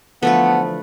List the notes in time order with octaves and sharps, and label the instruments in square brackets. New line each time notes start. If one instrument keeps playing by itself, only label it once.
[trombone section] D3 E3 F3 [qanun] A3 A4 B4 [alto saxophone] B3 [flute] F#5